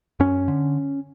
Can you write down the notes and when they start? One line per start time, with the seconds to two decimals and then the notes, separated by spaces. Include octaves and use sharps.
0.20 F#2 C#4
0.48 D3